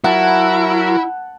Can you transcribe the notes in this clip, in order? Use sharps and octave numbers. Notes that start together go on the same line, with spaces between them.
F#3 E4 A#4 F#5 A5